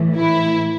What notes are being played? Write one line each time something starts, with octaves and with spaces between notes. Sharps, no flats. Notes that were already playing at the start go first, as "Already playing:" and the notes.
Already playing: A2 E3
E4